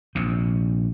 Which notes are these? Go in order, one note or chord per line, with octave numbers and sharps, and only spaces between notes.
A#1 C3